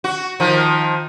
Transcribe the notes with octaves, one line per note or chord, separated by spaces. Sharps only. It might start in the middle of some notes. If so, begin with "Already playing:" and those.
F#4
D#3 F3